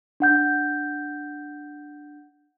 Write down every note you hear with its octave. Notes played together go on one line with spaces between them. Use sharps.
D4 F#5 G6